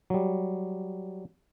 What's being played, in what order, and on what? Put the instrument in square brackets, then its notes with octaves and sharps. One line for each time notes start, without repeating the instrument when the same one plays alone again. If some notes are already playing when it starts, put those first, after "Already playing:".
[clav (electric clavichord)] F#3 G3